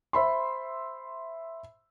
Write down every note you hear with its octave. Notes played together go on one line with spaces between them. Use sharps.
C5 E5 B5 C6